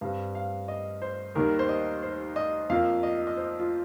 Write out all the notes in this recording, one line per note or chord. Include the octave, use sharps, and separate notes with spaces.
G2 G3 C4 F5
F5
D#5
C5
D#2 D#3 G3 A#3 A#4
C5
D#5
C5
D#5
F2 F3 A#3 F5
D#5
D#5
C5
F4